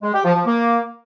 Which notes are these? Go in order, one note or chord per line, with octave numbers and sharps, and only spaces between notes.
G#3
G4
F3
F3
A#3